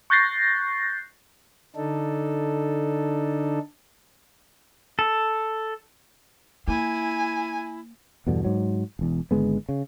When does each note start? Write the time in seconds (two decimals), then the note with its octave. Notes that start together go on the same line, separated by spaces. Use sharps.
0.10 C#6 F#6 G6 A6 A#6 C7
1.76 D3 D4 D#4 A4
4.99 A4
6.68 A#3 E4 G#5
8.27 E2 G2 B2 D3
8.45 G#2 F#3
8.99 E1 E2
9.31 G#1 D3 G#3 B3
9.69 C#3